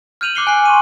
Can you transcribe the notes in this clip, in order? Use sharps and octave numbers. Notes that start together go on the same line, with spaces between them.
F6 G6 D#7 F7 F#7
D6 F#6 C7 C#7 G7
G#5 F#6 C7
C6 C#6 D#7